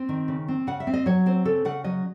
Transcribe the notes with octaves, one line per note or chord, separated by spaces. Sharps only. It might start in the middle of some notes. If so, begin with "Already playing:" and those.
Already playing: C4
D#3
C#3
C4
C#3 F#5
E5
C4
D#5
F#3 C#5
C4 C5
C#3 A4
C#3 F#5
F#3 D#5